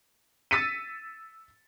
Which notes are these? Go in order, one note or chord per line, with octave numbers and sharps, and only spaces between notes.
E6 A6 B6 C#7 D#7